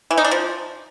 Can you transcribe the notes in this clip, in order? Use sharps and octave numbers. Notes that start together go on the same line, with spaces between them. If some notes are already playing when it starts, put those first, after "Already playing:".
E3
D#4
D4
F3